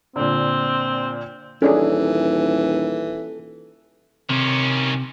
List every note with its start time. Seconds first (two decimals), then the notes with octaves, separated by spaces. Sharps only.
0.16 A#2 D3 C4
1.62 D#1 E3 C#4 D4 G#4 A4
4.30 C3 D#3 C#4